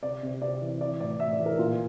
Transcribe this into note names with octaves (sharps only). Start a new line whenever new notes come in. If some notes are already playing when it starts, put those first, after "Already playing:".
C3 D5
C3
C3 D5
E3
E3 D5
A2 D5
A2 E5
D5
E3
A#4
A#2 F4